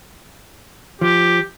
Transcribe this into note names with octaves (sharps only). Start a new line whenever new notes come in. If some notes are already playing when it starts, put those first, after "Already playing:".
F3 G4